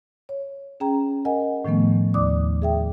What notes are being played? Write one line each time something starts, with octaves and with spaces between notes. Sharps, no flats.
C#5
C#4 G#4 G5 A#5
A#4 D#5 F#5 G#5
A2 D#3 F3 A3 B3
D#2 D5 D6 D#6
G#4 E5 G5